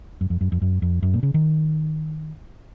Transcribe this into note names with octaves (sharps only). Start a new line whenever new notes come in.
F#2
F2
F#2
F2
F#2
F2
F#2
A#2
C#3
D#3